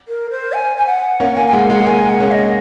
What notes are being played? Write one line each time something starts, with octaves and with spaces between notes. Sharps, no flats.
A#4
C5
G#5
G#5
F#5
A#3 C#4 F#5
A#3 G#5
G#5
G#3 F#5
G#3 F#5
G#3
A#3 G#5
F#5
A#3 C#4
D#5